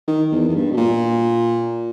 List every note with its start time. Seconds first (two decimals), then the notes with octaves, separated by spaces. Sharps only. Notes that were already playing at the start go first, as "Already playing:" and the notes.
0.08 D#3
0.32 E2
0.49 E2
0.55 G2
0.72 B2
0.77 A#2